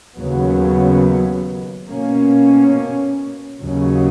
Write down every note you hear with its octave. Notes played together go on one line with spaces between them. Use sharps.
D#2 C#3 F#3 B3
B2 A#3 C#4
D#2 C#3 F#3 C#4